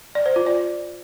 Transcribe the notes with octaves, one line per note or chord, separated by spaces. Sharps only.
D5
C5
F4
D5